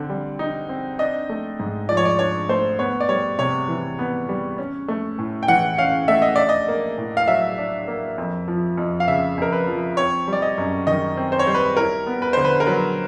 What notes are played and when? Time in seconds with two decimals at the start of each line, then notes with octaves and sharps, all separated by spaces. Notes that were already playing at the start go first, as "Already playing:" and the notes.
Already playing: D3 C4
0.09 G3
0.39 D#4
0.69 C4
0.99 D4 D#5
1.29 A3
1.59 G#2
1.89 F3 D5
1.97 C#5
2.05 D5
2.19 D4 C#5
2.49 A3 C5
2.79 B3 C#5
3.00 D5
3.09 G3 C#5
3.39 C3 C#5
3.68 E3
3.99 B3
4.29 G3
4.58 C#4
4.88 A3
5.19 A2
5.43 G5
5.48 E3 F#5
5.78 C#4 F5
6.08 A3 E5
6.22 D#5
6.36 D4 D5
6.49 D#5
6.68 A#3
6.98 A2
7.17 F5
7.28 F#3 E5
7.58 D4
7.88 A#3
8.18 F2
8.48 F3
8.77 F2
9.00 F5
9.08 C#3 E5
9.38 F2 A#4
9.53 B4
9.67 F3
9.97 C4 C#5
10.28 G3
10.33 D5
10.42 D#5
10.58 F#2
10.87 D#3 D#5
11.17 C4
11.32 C5
11.39 C#5
11.47 G3 C5
11.54 B4
11.77 E4 A#4
12.07 B3
12.22 B4
12.33 D3 C5
12.45 B4
12.60 A#4
12.67 F#3 B4